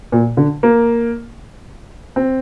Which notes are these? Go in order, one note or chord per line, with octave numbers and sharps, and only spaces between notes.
A#2
D3
A#3
C4